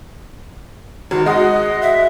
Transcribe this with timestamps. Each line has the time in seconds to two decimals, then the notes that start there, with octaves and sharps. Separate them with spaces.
1.11 G#1 F#4
1.26 G#3 F#4 D#5 D#6
1.82 E5